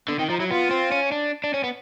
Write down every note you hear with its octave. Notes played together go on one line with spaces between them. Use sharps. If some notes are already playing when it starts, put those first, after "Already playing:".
D3 B3
D#3 C4
F3 D#4
F#3 E4
B3 F4
C4
C#4
D4
D4
C#4
B3